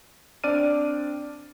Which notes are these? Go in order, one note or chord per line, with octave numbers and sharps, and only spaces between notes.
C4 D4 D5 F6 D#7